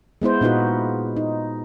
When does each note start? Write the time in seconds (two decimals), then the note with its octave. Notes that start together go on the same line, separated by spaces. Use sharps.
0.22 G#3 B3 E4 C5
0.41 A#2 B3 D#4 F4 F#4 B4
1.17 D#4